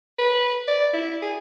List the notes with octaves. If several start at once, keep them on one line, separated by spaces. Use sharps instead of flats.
B4
D5
E4
G#4